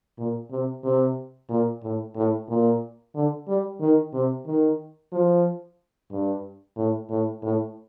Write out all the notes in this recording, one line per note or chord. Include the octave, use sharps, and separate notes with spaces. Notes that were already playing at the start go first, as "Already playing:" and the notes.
A#2
C3
C3
A#2
A2
A2
A#2
D3
G3
D#3
C3
D#3
F3
G2
A2
A2
A2